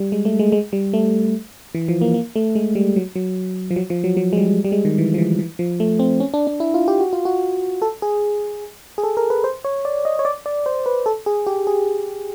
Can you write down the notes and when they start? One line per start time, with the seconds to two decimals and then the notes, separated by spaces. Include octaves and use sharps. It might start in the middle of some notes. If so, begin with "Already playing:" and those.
Already playing: G3
0.12 G#3
0.25 A3
0.39 G#3
0.52 G#3
0.73 G3
0.94 A3
1.75 E3
1.88 F3
2.01 A#3
2.14 A#3
2.36 A3
2.55 G#3
2.75 G3
2.96 F#3
3.15 F#3
3.71 F3
3.76 F#3
3.90 F3
4.04 F#3
4.17 F#3
4.33 G#3
4.37 G3
4.65 G3
4.72 G#3
4.85 D#3
4.98 E3
5.14 F3
5.18 E3
5.39 E3
5.59 F3
5.80 A3
5.99 C4
6.20 C#4
6.34 D4
6.47 D4
6.60 E4
6.74 F4
6.88 G4
7.00 F#4
7.13 F4
7.25 F#4
7.82 A4
8.02 G#4
8.98 G#4
9.03 A4
9.17 A#4
9.30 B4
9.44 C5
9.65 C#5
9.85 D5
10.05 D#5
10.19 C#5
10.25 D5
10.46 D5
10.66 C5
10.86 B4
11.06 A4
11.26 G#4
11.47 G4
11.67 G#4